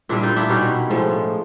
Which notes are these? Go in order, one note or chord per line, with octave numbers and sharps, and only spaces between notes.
A#2 G3 D4 E4
D#4 F4
D4 E4
B2 G3 C#4 D#4
A2 F3 G#3